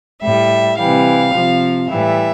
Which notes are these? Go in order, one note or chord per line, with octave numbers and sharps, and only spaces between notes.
A2 G3 E5
C3 E3 G3 F5
C3 F3
A2 E3 G3 E5